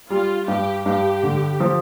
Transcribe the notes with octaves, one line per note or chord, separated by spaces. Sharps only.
G3 F4
G2 G4
G2 G4
D3
F3